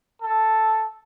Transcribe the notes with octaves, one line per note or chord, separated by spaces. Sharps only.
A4